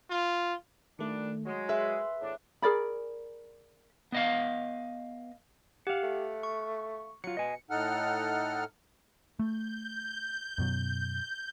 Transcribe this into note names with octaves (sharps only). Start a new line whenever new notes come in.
F4
A#2 D#3 G3 A3 D4
F#3 G#3
G#4 B4 E5 C6
E2 A2 D4
G#4 A#4 D5 B5
B3 D#5 F5
G4 F5 F#5
A3
C#6
F#3 F4 C#7
B2 D#5 G#5
A2 D#4 A4 F#5 F6
A3 G6
F#2 B2 F#3